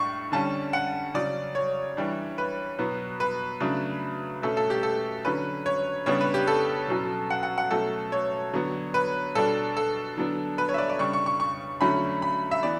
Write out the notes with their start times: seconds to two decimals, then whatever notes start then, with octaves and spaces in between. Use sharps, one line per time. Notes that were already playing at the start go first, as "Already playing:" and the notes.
Already playing: A2 G3 D4 C#6
0.32 D3 G3 C#4 A5
0.73 F#5
1.14 C#3 F#3 C#4 D5
1.55 C#5
1.97 E3 G3 D4
2.38 B4
2.79 B2 F#3 B3
3.20 B4
3.60 C#3 F#3 A3 D4
4.42 B2 A3 C#4 A4
4.57 A4
4.70 G4
4.83 A4
5.25 D3 F#3 C#4 B4
5.66 C#5
6.06 C#3 G3 B3 D4 C#5
6.21 B4
6.34 G4
6.47 A4
6.88 B2 F#3 C#4
7.30 F#5
7.43 F#5
7.58 F#5
7.71 B2 F#3 A3 C#4 A4
8.12 C#5
8.53 D3 F#3 B3
8.94 B4
9.35 B2 G3 D4 A4
9.77 A4
10.17 D3 F#3 B3 D4
10.58 B4
10.69 C#5
10.74 E5
10.78 D5
10.89 D5
10.99 C#3 G3 D4 C#6
11.13 C#6
11.26 C#6
11.40 C#6
11.81 D3 F#3 A3 C#4 B5
12.22 B5
12.51 E5
12.63 E3 B3 D5